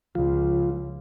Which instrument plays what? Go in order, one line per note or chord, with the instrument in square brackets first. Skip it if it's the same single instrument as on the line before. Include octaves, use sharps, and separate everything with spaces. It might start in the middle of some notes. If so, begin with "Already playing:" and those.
[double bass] C#2 [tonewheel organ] F3 F4